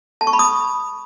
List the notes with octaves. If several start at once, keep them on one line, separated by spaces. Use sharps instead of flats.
A5
C#6
B5
D#6